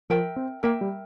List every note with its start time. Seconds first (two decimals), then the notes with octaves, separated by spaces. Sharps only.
0.10 F3 A#4 E5 G5
0.36 C4
0.63 A#3 A#4 E5 G5
0.81 G3